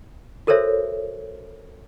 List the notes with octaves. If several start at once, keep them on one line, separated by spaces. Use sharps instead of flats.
F#4 A4 A#4 C5 C#5 E5